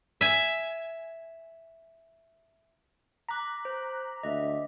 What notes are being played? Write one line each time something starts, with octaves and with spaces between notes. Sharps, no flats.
E5 G#5
A#5 D6 F#6 B6
C5
D2 D#5 E5